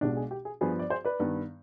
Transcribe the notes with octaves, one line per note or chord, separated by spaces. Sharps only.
B1 B2 G#3 D4 G4
G#4
G4
G#4
G2 F3 B3 G#4
D5
G#4 C5
B4 D5
G2 D#3 B3